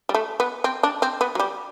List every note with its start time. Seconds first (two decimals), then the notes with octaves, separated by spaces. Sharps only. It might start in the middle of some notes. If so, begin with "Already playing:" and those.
0.09 G3
0.14 A3
0.40 B3
0.64 C4
0.83 D4
1.02 C4
1.21 B3
1.35 F#3
1.40 G3